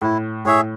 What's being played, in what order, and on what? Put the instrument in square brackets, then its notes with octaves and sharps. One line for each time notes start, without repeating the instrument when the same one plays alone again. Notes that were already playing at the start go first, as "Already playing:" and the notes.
[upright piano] A2 [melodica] E4
[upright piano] A2 [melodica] G#4 C#5 E5